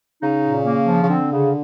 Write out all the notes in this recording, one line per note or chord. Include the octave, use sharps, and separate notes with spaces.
C#3 D#4
A#2
A#3
F3
C#3
D3 C4
C#3